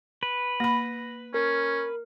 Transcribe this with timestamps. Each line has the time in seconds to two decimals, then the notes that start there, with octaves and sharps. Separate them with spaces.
0.23 B4
0.60 A#3 B5 A#6
1.34 C#4 A#4